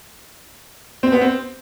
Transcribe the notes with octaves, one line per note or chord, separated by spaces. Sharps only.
C4
B3
C4